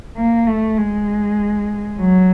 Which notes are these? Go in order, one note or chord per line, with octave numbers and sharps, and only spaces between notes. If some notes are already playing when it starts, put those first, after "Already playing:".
A#3
A3
G#3
F#3